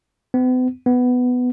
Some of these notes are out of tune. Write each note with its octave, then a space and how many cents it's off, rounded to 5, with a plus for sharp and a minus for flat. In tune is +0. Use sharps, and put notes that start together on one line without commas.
B3 +45
B3 +10